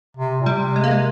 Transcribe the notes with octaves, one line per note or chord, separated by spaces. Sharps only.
C3
A#2
C3 G3
G#3
A#3
G#3